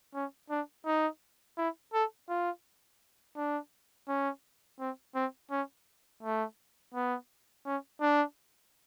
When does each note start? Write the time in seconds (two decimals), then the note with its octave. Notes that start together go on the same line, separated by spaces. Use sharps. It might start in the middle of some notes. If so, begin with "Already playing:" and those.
0.15 C#4
0.50 D4
0.86 D#4
1.58 E4
1.94 A4
2.29 F4
3.37 D4
4.08 C#4
4.80 C4
5.15 C4
5.51 C#4
6.23 A3
6.95 B3
7.66 C#4
8.02 D4